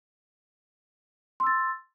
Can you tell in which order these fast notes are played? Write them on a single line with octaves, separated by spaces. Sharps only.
C6 E6 A6